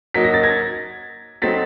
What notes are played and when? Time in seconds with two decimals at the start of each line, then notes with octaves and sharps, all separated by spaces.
0.14 F#3 A#3 D#4 B6
0.24 A#6
0.34 A6
0.43 G#6 A#6
1.42 F#3 A3 C4 D#4 A6 B6